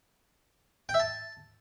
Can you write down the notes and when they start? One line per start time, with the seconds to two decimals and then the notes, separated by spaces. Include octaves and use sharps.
0.89 G5
0.94 E5
1.00 A5